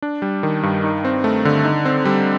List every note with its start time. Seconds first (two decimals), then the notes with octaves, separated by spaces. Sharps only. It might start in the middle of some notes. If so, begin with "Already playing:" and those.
0.02 D4
0.22 G3
0.43 D#3
0.63 G2
0.84 D#4
1.05 C4
1.24 A3
1.45 D3
1.65 D#4
1.85 C4
2.05 G3